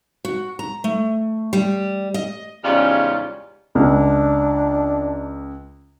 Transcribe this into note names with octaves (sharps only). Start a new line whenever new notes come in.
F#4
A#5
A3
G3
D#5
E2 G#2 C#3 G3 C#4 F4
C#2 D4